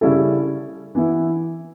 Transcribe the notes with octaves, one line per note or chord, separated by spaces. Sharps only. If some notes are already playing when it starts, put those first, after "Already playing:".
C#3 G3 C#4 E4 A4
E3 B3 E4